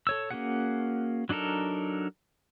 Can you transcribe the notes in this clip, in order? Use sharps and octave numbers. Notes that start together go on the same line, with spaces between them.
A4 C#5 E6
A#3 C#4 F#4 G#4 F#5
F#3 D4 D#4 A4 A#4